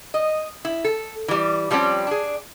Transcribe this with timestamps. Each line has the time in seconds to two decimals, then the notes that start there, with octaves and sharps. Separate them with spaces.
0.14 D#5
0.65 E4
0.84 A4
1.28 E3 G3
1.71 F3 G3 C4 C#4 G4
2.07 D4 G#4